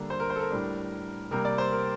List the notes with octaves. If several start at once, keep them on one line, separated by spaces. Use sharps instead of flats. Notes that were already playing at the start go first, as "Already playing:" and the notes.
Already playing: D3 G3 A#3 D4
C5
A#4
C5
A4
A#4
A2 G3 D4
C3 G3 A#3 A#4
D5
C5
A#4